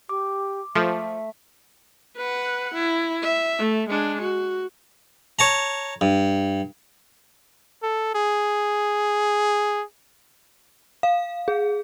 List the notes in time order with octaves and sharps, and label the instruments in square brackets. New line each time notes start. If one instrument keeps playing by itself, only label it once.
[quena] G4 [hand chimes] D6
[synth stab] F3 [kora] A3 [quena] E5
[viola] B4 F#5
E4
E5
A3
G#3 D4
F#4
[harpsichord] C#5 A5 A#5
G2
[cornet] A4
G#4
[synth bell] F5
G#4